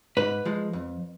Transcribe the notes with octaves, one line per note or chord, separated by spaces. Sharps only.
G#2 B4
F3 G#3
F2